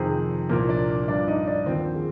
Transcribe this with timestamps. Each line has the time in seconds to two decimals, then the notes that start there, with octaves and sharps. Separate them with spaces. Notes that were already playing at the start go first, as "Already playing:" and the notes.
Already playing: F2 C3 D#3 G#4
0.49 C2 A#2 F3 A#3 A#4
0.69 D4 D5
1.08 G2 F3 D4 D5
1.28 D#4 D#5
1.47 D4 D5
1.66 D#2 D3 F3 C4 C5
1.95 G#4